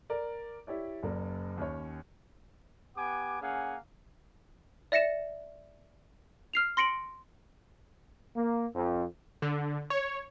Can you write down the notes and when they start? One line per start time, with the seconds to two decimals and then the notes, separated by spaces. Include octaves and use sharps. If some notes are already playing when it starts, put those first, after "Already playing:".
0.10 A#4 D5
0.67 E4 G4 C#5 D5
1.03 F#1 F#2 A#3 D5
1.57 D#2 C#4 C#5
2.97 B3 G4 F#5 G#5 D6
3.41 A#3 C#4 G#4 F5 F#5 G#5
4.92 D5 E5 A#6 C#7 E7
6.53 F6 C7 F7
6.77 C6 A#6 C#7 D7 F#7
8.37 A#3
8.75 F2
9.42 D3
9.90 C#5